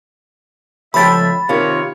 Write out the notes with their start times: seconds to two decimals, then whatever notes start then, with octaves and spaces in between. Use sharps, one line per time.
0.94 C#2 F3 A3 E5 G5 B5 A6
1.49 C3 D#3 F4 A#4 C#5